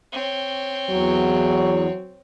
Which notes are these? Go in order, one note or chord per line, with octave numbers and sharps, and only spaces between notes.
C4 C#5
E2 F#3